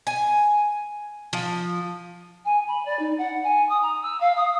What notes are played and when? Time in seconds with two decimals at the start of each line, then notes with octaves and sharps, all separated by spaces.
0.07 G#5
1.33 F3
2.45 G#5
2.67 B5
2.85 D5
2.99 D#4
3.18 F#5
3.44 G#5
3.69 D#6
3.82 A#5
4.02 E6
4.20 F5
4.36 D#6